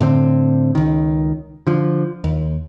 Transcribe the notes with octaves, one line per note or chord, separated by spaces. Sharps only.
A2 D3 C4
C#2 D#3
D3 F3
D#2